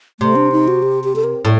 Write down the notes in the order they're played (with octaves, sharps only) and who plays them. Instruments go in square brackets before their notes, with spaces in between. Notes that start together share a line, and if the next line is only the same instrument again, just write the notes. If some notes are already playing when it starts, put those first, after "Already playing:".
[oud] C3 [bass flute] A3
[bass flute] D4
D#4
F#4
G4
G4
A4
A#4
[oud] A2